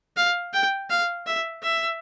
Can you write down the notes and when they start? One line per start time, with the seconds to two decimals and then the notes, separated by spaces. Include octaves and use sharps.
0.17 F5
0.53 G5
0.90 F5
1.27 E5
1.63 E5